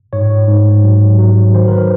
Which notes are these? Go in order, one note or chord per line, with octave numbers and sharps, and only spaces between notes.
G#2 C#5
G#2
F#3
F#3
D#3 C5
A#4
B4